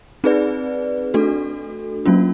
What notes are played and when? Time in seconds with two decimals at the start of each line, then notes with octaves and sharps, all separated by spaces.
0.24 C4 D#4 G#4 B4 D5
1.14 A3 D4 F#4 A4
2.05 F#3 A#3 C#4 F4